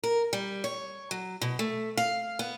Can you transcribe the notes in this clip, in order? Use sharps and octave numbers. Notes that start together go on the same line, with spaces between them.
A#4
G3
C#5
F#3
B2
A3
F5
B3